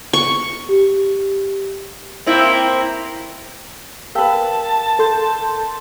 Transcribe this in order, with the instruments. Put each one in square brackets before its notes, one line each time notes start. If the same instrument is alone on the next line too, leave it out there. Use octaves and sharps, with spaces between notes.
[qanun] C#6
[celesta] G4
[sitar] A#3 C4 E4
[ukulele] G4 B4 [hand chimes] A#4 F5 E6 [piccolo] A5
[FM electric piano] A4 C6 G6